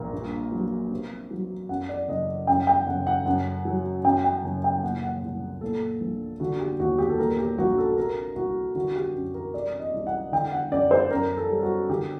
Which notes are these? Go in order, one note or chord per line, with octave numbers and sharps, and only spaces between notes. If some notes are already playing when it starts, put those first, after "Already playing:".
Already playing: A#1 A#2 A#4
G2
F#3
C3
F#3
F#2 F#5
D5
F#1 D#5
F#2 G5
G5
F#1 F#5
F#5
F#2 F#5
F#3
F#2 G5
G5
F#1
G5
A#2 F#5
F#5
C2
A#2 A4
A#1
D3 F#4
G4
D#2 F#4
G4
A4
A#2 A#4
G4
A#1 F#4
A4
C3 A#4
C2 F#4
D3 F#4
G4
F#2
A#4
C3 D5
D#5
C2
F#5
D3 G5
F#5
F#2 D5
C5
F#2 A#4
A4
G3
F#4
D3 G4